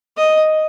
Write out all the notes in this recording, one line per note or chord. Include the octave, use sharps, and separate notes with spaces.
D#5